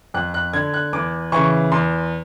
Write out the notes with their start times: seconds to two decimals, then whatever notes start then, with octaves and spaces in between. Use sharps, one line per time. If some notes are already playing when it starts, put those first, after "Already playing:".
0.14 F2 F#6
0.34 F#6
0.53 D3 G#6
0.74 F#6
0.93 E2 D6
1.32 C#3 E3 C#6
1.71 E2 C6